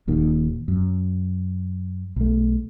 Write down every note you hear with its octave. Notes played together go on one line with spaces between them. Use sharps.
D#1 D#2 A#2 D#3
F#2
B1 A3